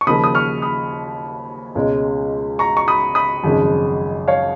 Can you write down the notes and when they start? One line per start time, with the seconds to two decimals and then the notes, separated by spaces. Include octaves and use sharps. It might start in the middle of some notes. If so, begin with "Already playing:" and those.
0.01 C#6
0.06 D#2 C#3 F3 A#3 B5 D#6
0.24 D#6
0.35 C#6 F6
0.62 B5 D#6
1.75 C#2 B2 G#3 C#4
2.59 A#5 C#6
2.77 C#6
2.88 B5 D#6
3.15 B5 D#6
3.44 G#1 F#2 C#3 F3 G#3
4.28 C#5 F5